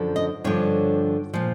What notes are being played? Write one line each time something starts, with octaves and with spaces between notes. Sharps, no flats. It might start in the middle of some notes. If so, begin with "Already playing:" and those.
Already playing: F#2 D3 F3
D#5
G2 D3 F3 C#5
A#2 F3